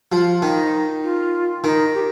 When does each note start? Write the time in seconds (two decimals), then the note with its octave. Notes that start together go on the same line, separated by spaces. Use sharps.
0.12 F3 F4
0.42 D#3 D#4
1.03 F4
1.64 D#3 D#4
1.94 G4